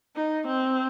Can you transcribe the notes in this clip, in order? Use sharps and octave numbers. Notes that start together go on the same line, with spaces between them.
D#4
C4